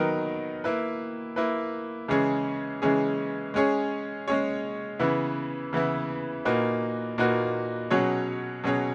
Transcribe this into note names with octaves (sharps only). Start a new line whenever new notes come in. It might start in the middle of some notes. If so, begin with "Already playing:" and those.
Already playing: D#3 F#3 B3 D#4 A#4
A#3 E4 B4
A#3 E4 B4
C#3 E3 G#3 C#4 G#4
C#3 E3 G#3 C#4 G#4
G#3 C#4 G#4 C#5
G#3 C#4 G#4 C#5
C#3 E3 B3 E4
C#3 E3 B3 E4
A#2 A#3 D#4 F#4 B4
A#2 A#3 D#4 F#4 B4
B2 F#3 C#4 G#4 C#5
B2 F#3 C#4 G#4 C#5